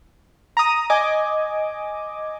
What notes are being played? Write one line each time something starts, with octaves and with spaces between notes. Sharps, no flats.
A#5 D#6
D#5 G#5 D6